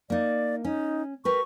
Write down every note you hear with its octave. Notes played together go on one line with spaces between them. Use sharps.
A#3 D#4 D5
C#4 D#4
G4 A#4 B4 C#6